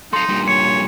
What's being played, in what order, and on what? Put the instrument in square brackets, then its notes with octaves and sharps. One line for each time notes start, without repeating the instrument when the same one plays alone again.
[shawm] D#4 [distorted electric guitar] A4 F5 [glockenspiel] C6
[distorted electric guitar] G2 A#2
[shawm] C#5 [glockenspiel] C#7